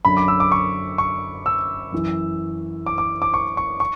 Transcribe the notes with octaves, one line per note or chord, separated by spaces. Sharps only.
F#2 D3 F#3 B5
D6
E6
D6
C#6
C#6
E6
F#2 E3
D6
D6
D6
C#6
C#6
C#6